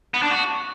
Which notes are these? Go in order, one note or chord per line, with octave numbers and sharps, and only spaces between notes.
B3
D4
F#4